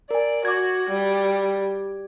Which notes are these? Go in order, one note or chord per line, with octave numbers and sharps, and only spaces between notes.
A#4 D5 G#5
F#4 D6 G#6
G3